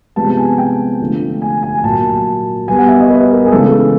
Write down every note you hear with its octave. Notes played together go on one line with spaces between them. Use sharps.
C3 F3 G#3 B3 A5
A5
G#5
G5
D3 F3 A3
G#5
G#5
G#5
A#2 F#3 A#3 A5
B2 G3 B3 G#5
F#5
E5
D#5
B4
A#4
G#4
C#3 E3 G#3 B3 A4